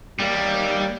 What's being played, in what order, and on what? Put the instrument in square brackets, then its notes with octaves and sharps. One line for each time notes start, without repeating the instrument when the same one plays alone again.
[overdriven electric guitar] G3 [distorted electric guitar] A#3 G4